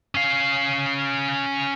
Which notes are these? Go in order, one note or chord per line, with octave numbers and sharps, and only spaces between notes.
C#4 F5